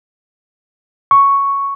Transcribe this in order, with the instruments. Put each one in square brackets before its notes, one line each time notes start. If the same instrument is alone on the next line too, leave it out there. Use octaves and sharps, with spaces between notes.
[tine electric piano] C#6